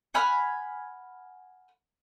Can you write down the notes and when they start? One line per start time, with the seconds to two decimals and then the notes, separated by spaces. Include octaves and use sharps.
0.14 F#5 G#5 B5 F6